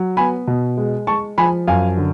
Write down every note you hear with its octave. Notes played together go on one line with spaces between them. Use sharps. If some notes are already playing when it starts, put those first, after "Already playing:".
Already playing: F#3
B3 G#5 B5
B2
G#3
G#3 A5 C#6
F3 G#5 B5
F#2 F5 G#5
D3